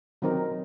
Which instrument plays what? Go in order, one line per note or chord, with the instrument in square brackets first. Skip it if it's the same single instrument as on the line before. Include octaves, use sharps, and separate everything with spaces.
[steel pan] D#3 F#3 C4 D#4 A#4